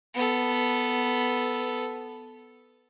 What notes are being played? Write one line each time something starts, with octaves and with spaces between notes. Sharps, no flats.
B3 A4